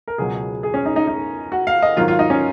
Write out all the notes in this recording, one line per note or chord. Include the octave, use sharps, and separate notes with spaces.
A#4
C#2 B2 F#3 G#4
G#4
C#4
D#4
D#4
D#4
F#4
F5
D#5
G#2 D#3 F#3 F4
F4
D#4
C#4